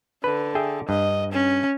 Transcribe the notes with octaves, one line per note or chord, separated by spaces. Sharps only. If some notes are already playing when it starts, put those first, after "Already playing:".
D3 B4
G#4 E5 G5
G2 D#5
C#4